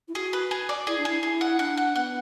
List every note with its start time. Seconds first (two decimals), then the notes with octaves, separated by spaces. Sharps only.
0.08 E4
0.15 F#4 G#4
0.33 B4
0.51 G#4
0.69 D5
0.87 E4 G#4
0.98 D4
1.05 E4 G#4
1.23 E4 G#4
1.41 F#5
1.59 D4 F#5
1.77 F#5
1.96 B3 F#5